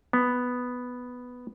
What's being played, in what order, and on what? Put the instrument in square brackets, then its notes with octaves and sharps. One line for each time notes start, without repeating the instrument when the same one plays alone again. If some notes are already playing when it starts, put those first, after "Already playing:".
[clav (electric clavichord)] B3